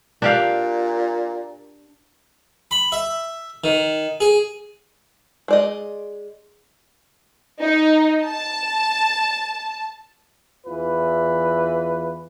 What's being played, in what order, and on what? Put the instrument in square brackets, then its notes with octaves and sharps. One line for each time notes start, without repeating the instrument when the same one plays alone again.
[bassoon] A#2 [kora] D4 G4 F5
[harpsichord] B5
E5
D#3
G#4
[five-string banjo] G#3 D5 D#5
[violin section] D#4
A5
[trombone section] E2 E3 F4 B4